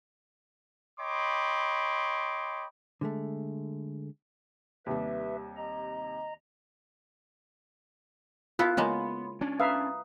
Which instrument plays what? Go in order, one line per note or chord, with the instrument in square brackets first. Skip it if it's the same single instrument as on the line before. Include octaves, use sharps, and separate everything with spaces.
[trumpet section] C#5 D#5 G5 B5 C6 D6
[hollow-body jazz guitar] D3 G#3 A3
[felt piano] D#2 C3 G3 [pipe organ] B4 E5
[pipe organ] D#5 A#5
[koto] B3 E4 A4 [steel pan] F4 [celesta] F#6
[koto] C#3 G#3 A#3 [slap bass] B3 [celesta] C#5 B5 C6
[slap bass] C#4 D4
[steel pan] B4 E5 F5 [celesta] A#5 D#6